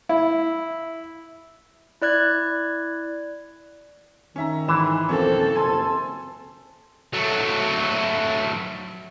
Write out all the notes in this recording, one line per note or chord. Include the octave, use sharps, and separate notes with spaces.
E4
E4 D5 F#6 G#6
D#3 C#4 E5 A#5
G#2 E3 E7
B1 F2 F3 A#3 C4 C#4 A4 C#5
F#1 C3 G#5 A5 C6 E6
F#3 A3